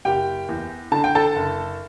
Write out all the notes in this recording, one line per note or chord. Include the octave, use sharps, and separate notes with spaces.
F#1 G4 G5
E2
D3 A5
G5
A4 A5
F#1